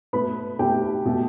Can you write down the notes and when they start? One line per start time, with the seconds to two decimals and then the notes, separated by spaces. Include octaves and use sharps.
0.13 B2 A3 B4 B5
0.59 B2 A3 G4 G5
1.05 B2 A3